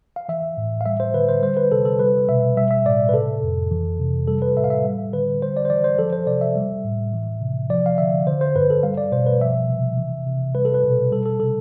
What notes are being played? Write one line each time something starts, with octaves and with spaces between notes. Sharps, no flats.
F5
E3 E5
A2
F5
G3 E5
C5
D3 B4
C5
G3 C5
B4
C3 A4
A4
G3 B4
B2 E5
G3 E5
E5
A2 D5
B4
C3 A4
F2
E3
C3
G3 A4
B4
A2 E5
F5
E5
G3
D3 B4
G3 C5
D5
C5
E3 D5
C5
F3 A4
C5
C3 D5
E5
G3
A2
E3
C3
F3 D5
F5
D3 E5
D3 C5
C5
G2 B4
A4
G3 F5
D5
B2 C5
B4
F3 E5
C3
E3
C3
G3 B4
A4
B4
B2
G3 A4
A4
C3 A4